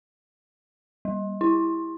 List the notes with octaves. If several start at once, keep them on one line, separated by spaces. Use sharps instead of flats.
G3
E4